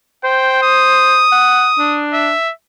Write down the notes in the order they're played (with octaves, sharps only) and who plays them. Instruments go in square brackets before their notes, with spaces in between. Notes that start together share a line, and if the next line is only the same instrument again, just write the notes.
[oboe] C5 [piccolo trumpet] G5
[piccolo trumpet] D#6
[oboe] F#5
D4
[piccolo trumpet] E5